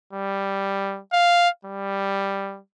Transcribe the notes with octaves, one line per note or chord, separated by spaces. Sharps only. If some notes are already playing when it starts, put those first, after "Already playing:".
G3
F5
G3